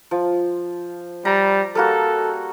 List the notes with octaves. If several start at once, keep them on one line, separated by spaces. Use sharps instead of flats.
F3
G3 A#5
G3 A#3 F#4 A4